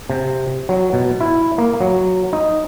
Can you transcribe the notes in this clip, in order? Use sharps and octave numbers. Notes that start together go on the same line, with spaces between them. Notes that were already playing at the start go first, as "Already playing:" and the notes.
C3
F#3
B2
E4
A#3
F#3
D#4